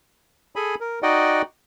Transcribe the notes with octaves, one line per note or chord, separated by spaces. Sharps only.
G#4 A4 G#5 B5
A#4
D#4 F#4 D5 D#5 F#5 G5